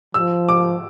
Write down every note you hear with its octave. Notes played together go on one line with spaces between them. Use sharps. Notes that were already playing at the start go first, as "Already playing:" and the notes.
F3 E6
D6